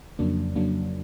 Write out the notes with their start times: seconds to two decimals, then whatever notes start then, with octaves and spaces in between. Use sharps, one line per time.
0.19 F2 C#3 F#3 A#3 D4
0.56 F2 C#3 F#3 A#3 D4